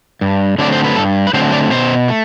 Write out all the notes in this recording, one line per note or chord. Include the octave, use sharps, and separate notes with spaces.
G2
D3 F#3 A3 C4 D5
C5
B4
G2 A4
B4
D3 F#3 A3 C4 C5
D5
B2 C5
A3